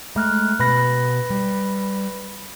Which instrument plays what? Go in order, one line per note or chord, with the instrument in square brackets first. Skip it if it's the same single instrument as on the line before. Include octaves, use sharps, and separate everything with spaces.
[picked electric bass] G#3 [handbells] A3 F6 F#6
[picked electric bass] B2 [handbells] B4 B5 A#6
[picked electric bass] G3